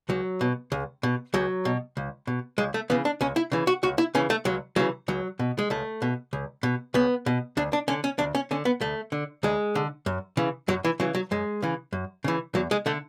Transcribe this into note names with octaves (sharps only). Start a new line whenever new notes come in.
C#2 F#3
B2
C#2
B2
C#2 F#3
B2
C#2
B2
C#2 G#3
A3
C#3 E3 B3
D4
C#2 C#4
E4
C#3 E3
F#4
C#2 F#4
E4
C#3 E3 C#4
A3
C#2 F#3
C#3 E3 F#3
C#2 F#3
B2
G#3
C#2 A3
B2
C#2
B2
C#2 B3
B2
D2 D4
D4
D3 C#4
C#4
D2 D4
C#4
D3 C#4
B3
D2 A3
D3
D2 G#3
D3
F#2
C#3 E3
F#2 F#3
E3
C#3 E3 F#3
F#3
F#2 G#3
C#3 E3
F#2
C#3 E3
E2 F#3
G#3
D3 A3